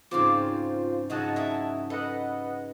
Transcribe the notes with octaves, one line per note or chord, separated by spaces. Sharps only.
G#2 C#3 C4 F4 C5 D5 D6
G#2 C#3 F#3 D#5 F#5 A5
E4 E5 D#6
A4 B4 D#5 F#5